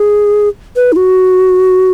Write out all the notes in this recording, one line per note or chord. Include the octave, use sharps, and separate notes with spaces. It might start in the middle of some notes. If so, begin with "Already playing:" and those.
Already playing: G#4
B4
D#4
F#4